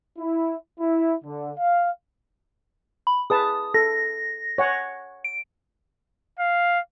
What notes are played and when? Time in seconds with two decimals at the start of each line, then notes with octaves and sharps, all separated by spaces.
0.19 E4
0.79 E4
1.24 D3
1.57 F5
3.07 B5
3.30 G#4 B4 A5 D#6
3.74 A4 A#6
4.58 C#5 F#5 G#5
5.24 D7
6.39 F5